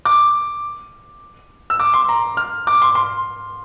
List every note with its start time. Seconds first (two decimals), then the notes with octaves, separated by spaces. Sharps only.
0.05 D6
1.70 E6
1.80 D6
1.94 C6
2.09 A#5
2.37 F6
2.67 D6
2.82 C6
2.95 C6